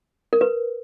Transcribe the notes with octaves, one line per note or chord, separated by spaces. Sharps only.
A#4
B4